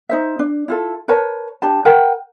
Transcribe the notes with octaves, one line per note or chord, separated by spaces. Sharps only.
D#4 C5 E5
D4
E4 F4 A4
A#4 B4 C#5 A5
D4 G4 A5
A#4 B4 F#5 G5